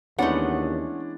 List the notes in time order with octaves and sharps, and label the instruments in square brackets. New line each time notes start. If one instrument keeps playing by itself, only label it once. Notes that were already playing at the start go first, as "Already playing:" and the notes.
[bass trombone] D#2 [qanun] E3 G#3 B3 [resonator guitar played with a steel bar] A3 F#5 [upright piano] C#4 D4